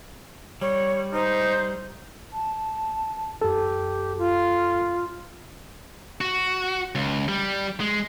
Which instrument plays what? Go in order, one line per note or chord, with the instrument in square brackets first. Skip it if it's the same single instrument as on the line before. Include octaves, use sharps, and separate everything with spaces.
[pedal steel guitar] G3 [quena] C#5
[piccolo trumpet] D#4 [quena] C5
[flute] A5
[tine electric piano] F#2 A4 [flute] G4
[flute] F4
[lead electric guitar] F#4
C#2
G3
G#3